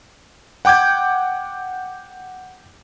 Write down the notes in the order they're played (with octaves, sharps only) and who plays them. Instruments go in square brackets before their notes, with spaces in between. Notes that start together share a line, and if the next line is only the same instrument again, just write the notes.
[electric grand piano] F#5 G5 D6 G6 G#6